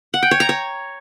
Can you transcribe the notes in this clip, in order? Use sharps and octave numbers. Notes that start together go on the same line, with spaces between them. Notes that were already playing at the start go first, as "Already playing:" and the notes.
F#5
G5
C#5
A#5
C#5